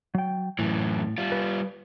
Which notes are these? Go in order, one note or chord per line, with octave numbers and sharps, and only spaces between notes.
F#3 G5
F#2 A2 E3
G3 F4
B4